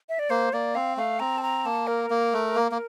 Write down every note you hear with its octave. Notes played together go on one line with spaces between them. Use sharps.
E5
D5
A#3 C5
A#3 D5
C4 F5
A3 F5
C4 A#5
A5
A#5
A#3 A5
A#4
A#3
A3
A#3
A#3